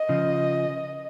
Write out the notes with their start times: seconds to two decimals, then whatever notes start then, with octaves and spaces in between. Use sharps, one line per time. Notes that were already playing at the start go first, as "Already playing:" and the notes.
Already playing: D#5
0.09 C#3 F3